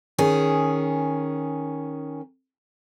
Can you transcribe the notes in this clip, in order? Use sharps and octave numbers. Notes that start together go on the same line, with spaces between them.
D#3 C#4 G#4